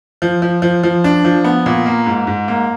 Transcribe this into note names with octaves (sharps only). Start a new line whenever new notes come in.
F3
F3
F3
F3
D4
F3
B3
A#2
A#3
G#2
G#2
A#3